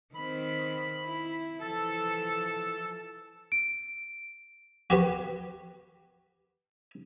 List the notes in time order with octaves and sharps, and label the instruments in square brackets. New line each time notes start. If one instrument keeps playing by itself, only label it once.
[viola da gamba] D#3 C4 [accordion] B5
[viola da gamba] E4
[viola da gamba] E3 F3 A4 [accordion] A5 E6
[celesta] D7
[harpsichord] F#4 G4 B4